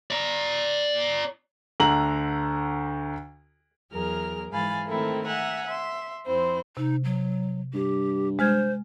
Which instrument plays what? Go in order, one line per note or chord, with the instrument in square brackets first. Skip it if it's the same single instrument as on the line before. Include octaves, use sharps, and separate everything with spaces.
[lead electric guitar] D5 A#5
[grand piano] D2 D3 A#5 F#7
[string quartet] E2 F#3 G#4 A#4 F6
G#2 E3 F5 G#5 B5 A6
D#3 A3 C4 E4 A4 A#4
E5 F#5 G#5 A#5
E5 C6
F2 C4 E4 C5
[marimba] C3 [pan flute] D#4
[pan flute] F#3
[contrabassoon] G2 [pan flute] G4
[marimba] G#3 F6 G#6 [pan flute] C5